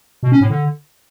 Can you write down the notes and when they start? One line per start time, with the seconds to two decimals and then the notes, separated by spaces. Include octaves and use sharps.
0.23 B2
0.32 C#4
0.41 A2
0.50 D3